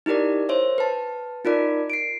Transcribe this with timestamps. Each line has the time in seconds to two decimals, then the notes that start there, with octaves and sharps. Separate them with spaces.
0.06 D#4 E4 G4 A#4 D5
0.49 C5 C#5 E5
0.78 B4 A5
1.45 D#4 F4 A#4 D5
1.90 C7 D7